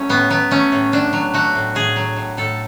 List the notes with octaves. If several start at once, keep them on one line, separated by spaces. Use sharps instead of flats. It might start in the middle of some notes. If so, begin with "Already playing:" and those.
Already playing: F#3 A3 C#4
A2 B3
F#3 B3
A3 C#4
A2
A2 D4
F#3
A3 F#4
A2
A2 G#4
F#3
A2
A2 A4